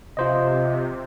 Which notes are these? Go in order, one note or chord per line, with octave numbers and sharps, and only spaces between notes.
C3 F4 C5 D#5